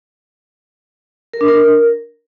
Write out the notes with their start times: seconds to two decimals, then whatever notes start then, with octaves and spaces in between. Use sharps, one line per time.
1.33 A#4
1.41 D4
1.48 A#4